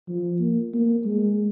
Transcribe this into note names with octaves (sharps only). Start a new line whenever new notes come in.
F3
A#3
A#3
G#3